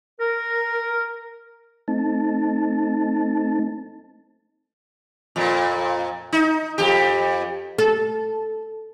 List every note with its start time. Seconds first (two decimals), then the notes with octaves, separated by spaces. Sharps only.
0.20 A#4
1.88 A3 C4 D#4 A5
5.36 F2 A#2
6.33 D#4
6.78 F2 G4
7.78 A4